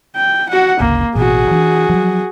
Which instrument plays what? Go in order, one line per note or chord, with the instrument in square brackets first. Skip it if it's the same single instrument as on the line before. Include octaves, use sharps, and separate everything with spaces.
[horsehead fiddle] G5
F#4 F#5
[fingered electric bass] G#1 D2 C#3 [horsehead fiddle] A#3
[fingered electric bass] A1 B2 [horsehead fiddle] F#4 G#4
[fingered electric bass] E3 D4
F3 F#3